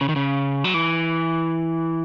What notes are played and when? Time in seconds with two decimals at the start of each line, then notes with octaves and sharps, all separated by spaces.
0.01 C#3
0.09 D#3
0.16 C#3
0.64 F#3
0.74 E3